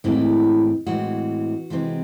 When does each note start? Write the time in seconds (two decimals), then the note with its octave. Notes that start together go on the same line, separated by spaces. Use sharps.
0.04 A2 E3 G#3 C4 E4
0.87 A2 E3 G#3 C4 F#4
1.70 C3 E3 G#3 C4